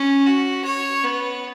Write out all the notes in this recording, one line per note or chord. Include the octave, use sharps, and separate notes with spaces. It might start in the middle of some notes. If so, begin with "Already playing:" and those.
Already playing: C#4
F#4
C#5
B3